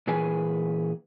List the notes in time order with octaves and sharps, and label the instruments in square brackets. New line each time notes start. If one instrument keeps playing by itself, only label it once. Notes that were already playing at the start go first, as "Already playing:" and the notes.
[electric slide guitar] A#2 E3 G#4 B4 G#5